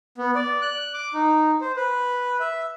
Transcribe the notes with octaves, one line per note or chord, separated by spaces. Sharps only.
B3
D5
F#6
D6
D#4
C5
B4
E5